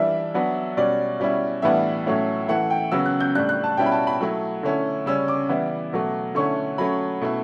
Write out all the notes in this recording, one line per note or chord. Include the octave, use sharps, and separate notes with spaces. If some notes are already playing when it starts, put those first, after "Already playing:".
Already playing: E3 G3 D4 E5
F#3 B3 D4
B2 G3 C#4 D5
B2 G3 C#4 E4
A2 E3 G3 B3 D4 E5
A2 F#3 A3 C#4 E4
E3 A3 E4 F#5
G5
C#3 F#3 B3 E6
F#6
G6
A2 G3 D4 F#6
F#6
A5
B2 G3 C#4 E4 G5
B5
A5
B5
F#3 A3 E4
D3 A3 C#4 E4
C#3 G3 C#4 E6
D6
E3 G3 B3 E4
B2 F#3 A3
D3 A3 C#4 E4 C#6
F#3 A3 C#4 B5
B2 A3 E4